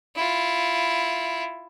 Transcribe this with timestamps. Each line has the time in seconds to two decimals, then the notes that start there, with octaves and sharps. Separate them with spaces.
0.16 E4 F4